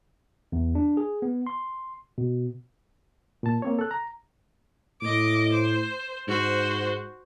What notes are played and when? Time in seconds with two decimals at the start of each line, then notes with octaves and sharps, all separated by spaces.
0.52 E2
0.75 D4
0.97 G#4
1.22 B3
1.47 C6
2.18 B2
3.43 A#2 A5
3.62 A#3 C4 C#5
3.79 A4 F#6
3.91 A#5
5.02 A2 D#5 D6
5.53 C5
6.28 G#2 F#4 C5